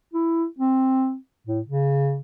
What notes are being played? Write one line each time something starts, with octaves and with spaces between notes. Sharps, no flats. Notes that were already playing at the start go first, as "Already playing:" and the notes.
E4
C4
A2
C#3